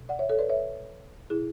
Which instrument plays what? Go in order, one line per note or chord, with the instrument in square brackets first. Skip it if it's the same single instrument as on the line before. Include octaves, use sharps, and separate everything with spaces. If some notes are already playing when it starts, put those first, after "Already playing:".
Already playing: [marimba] B2
D5 F#5
C#5 E5
A4 C#5
B4 D5
C#5 E5
B2 E4 G#4